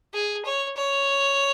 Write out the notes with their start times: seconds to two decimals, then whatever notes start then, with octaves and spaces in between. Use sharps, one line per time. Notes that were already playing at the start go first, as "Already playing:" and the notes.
0.14 G#4
0.45 C#5
0.77 C#5